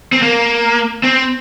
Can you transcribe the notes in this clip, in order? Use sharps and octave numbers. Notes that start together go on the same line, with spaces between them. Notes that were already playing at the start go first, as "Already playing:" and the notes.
C4
A#3
C4